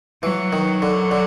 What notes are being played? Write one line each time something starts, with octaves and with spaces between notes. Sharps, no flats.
E3 F#3
D#3
D3
D3